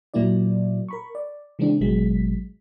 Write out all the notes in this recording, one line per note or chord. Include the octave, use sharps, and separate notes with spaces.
A#2 F#3 A#3 E4 D5
A#4 B5 C#6
D5
C#3 E3 G#3 C4 D4
G#1 B2 F#3 G#3 B6